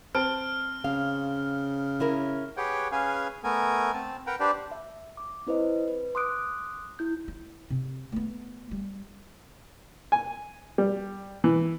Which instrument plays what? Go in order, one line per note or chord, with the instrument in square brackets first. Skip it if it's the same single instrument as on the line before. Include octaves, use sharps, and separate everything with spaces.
[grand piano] C4 A5 D7 [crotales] F6
[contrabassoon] C#3 [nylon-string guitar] F5
[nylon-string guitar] C#4 E4 A#4
[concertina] G4 G#4 B4 C#5 F#5 G5
C#4 G#4 B4 F5 G#5
A3 B3 A#4 G#5
C4 A5
A#4 B4 F#5 G5 A#5
D4 G4 B4 C5 D5
[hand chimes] E5
D6
C4 E4 B4 C5 D#5
B4
C6 D6 D#6 F#6 D7
E4 G6
[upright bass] E4
C3
A3 B3
G3
[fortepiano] G#5
G3
E3